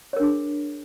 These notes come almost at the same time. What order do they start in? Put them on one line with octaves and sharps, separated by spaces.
C#5 A#4 D4 G#4